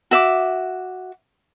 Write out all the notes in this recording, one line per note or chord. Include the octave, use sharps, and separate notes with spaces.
F#4 E5 D6